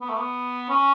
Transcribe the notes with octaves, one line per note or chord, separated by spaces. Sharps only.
B3
A3
B3
C#4